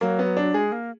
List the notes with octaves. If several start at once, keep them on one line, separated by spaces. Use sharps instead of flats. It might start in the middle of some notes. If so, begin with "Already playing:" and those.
F#3 A#3
B3
D4
G#3 G#4
A#3